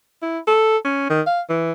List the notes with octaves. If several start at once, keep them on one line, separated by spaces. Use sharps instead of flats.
E4
A4
C#4
D#3
F5
E3